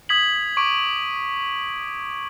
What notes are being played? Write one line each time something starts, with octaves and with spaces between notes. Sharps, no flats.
D#6 G#6 B6 F#7
C#6 D6 D7